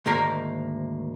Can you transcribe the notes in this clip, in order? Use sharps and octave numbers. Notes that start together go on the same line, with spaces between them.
D2 G#2 D#3 A#3 A#4